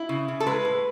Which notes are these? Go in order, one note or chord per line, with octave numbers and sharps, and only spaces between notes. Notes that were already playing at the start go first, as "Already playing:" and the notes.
Already playing: E4
C#3
C#3
A4
G#3 B4
A2